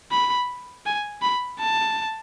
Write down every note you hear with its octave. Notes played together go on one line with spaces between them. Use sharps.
B5
G#5
B5
A5